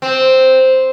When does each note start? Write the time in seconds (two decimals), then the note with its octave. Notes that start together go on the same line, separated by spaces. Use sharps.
0.02 C4